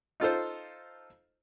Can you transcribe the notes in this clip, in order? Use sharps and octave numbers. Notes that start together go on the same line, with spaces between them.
D#4 F4 A4 C5